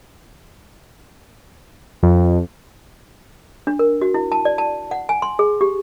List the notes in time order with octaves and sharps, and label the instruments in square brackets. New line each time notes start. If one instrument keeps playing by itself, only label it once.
[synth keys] F2
[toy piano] D4
A#4
F#4
E4
A5
D5
A5
F#5
G#5
C6
G#4
G4